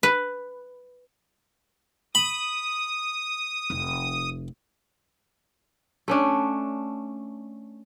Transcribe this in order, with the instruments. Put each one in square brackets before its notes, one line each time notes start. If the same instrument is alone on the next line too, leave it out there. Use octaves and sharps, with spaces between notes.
[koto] B4
[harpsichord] B5 [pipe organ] D#6
[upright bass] F1
[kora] A3 C#4 D4